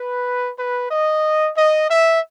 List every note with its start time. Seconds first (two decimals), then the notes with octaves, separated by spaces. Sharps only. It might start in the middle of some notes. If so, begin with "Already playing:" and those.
Already playing: B4
0.58 B4
0.91 D#5
1.57 D#5
1.90 E5